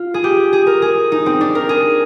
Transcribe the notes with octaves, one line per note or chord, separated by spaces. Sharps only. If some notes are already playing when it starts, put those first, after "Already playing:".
Already playing: F4
G#4
G4
G#4
A#4
G#4
D#4
C4
D4
A#4
G#4